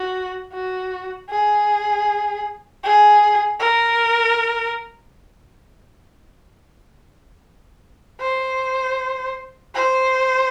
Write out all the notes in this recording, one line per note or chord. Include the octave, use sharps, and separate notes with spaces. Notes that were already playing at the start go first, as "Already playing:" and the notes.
Already playing: F#4
F#4
G#4
G#4
A#4
C5
C5